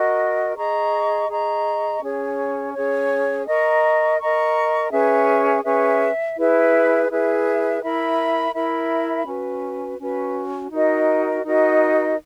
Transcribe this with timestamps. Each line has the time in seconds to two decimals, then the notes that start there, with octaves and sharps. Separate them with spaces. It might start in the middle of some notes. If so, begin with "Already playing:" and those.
Already playing: F#4 A#4 D#5
0.56 G#4 D#5 A#5 C#6
1.29 G#4 D#5 A#5 C#6
2.01 C#4 G#4 C#5
2.74 C#4 G#4 C#5
3.46 A#4 D#5 A#5 C#6
4.19 A#4 D#5 A#5 C#6
4.91 C#4 G#4 B4 E5
5.64 C#4 G#4 B4 E5
6.37 E4 G#4 B4 E5
7.09 E4 G#4 B4 E5
7.82 E4 A#4 E5 B5
8.54 E4 A#4 E5 B5
9.26 C#4 F#4 B4
9.99 C#4 F#4 B4
10.71 D#4 F#4 A#4 D#5
11.44 D#4 F#4 A#4 D#5